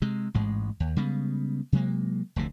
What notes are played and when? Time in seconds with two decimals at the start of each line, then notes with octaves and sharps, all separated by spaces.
0.02 C3 G#3
0.34 A1 G#2 G#3
0.80 D#2
0.96 C#3 G3 G#3 B3
1.72 C3 F#3 G#3 A#3
2.36 F1 D2 C3